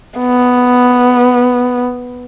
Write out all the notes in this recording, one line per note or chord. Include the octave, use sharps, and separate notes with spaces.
B3